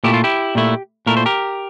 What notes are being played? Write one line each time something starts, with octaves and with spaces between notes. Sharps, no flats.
A#2 A3 E4 G4
F4
E4 G4
A#2 A3 E4
A#2 A3 E4 A#4
C5
G4 A#4